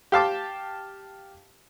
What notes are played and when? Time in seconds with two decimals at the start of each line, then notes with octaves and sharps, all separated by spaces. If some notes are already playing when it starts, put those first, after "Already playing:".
0.12 G4 F5 A5 D6